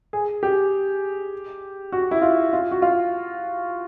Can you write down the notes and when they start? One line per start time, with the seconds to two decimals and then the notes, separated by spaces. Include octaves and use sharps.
0.13 G#4
0.43 G4
1.92 F#4
2.11 E4
2.22 F4
2.53 F4
2.71 F#4
2.82 F4